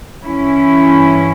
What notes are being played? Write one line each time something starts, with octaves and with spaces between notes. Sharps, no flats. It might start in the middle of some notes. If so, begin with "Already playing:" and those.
G2 E3 C#4 E4